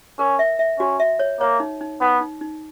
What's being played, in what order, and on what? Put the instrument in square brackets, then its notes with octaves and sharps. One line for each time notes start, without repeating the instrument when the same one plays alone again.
[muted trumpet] C#4 [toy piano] A#4
[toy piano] E5
E5
[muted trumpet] C#4 [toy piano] F#4
[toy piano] E5
C#5
[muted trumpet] A#3 [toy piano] C#5
[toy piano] D#4
D#4
[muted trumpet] B3 [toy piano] D#4
[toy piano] D#4
D#4